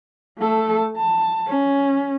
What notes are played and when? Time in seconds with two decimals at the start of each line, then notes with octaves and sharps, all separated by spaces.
0.39 A3 A4
0.97 A5
1.48 C#4